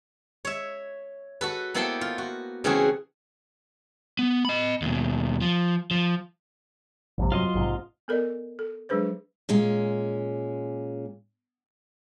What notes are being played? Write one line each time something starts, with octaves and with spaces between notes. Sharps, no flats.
C#5 E5
F#4 A4 B4
A#3 B3 E4 A4 C5 G5
F4
F#4
C#3 E3 A3 C4 F#4 G#4
B3
D#5 B5
D#2 B2
F3
F3
F1 A#1 G2 C3
F#3 F4 D#5 C6
A#1 G#2 C3
B3 A4 A#4 D5 D#5
A4
F#3 G#3 D4 G#4 B4 C5
A#2 G#3 C#4